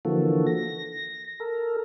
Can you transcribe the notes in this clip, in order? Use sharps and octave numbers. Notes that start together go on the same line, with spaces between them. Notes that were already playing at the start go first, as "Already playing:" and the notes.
D3 E3 F3 A#3 F#4 A4
A#6
A4 A#4